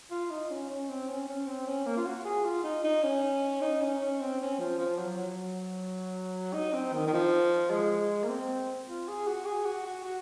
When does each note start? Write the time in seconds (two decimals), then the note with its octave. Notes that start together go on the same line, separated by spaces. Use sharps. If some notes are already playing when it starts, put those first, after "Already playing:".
0.11 F4
0.30 D#4
0.50 C#4
0.69 C#4
0.89 C4
1.08 C#4
1.27 C#4
1.47 C4
1.67 C#4
1.86 A#3
1.97 F4
2.06 F#4
2.24 G#4
2.44 F4
2.63 D#4
2.84 D#4
3.03 C#4
3.61 D#4
3.81 C#4
4.00 C#4
4.21 C4
4.40 C#4
4.59 F3
4.78 F3
4.98 F#3
5.17 F#3
6.53 D#4
6.73 C4
6.93 D#3
7.07 D#3
7.13 F3
7.70 G#3
8.24 A#3
8.29 C4
8.87 F4
9.08 G#4
9.27 F#4
9.46 G#4
9.65 F#4
9.86 F#4
10.04 F#4